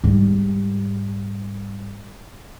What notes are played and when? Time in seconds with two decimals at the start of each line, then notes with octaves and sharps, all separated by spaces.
0.04 G#2 G3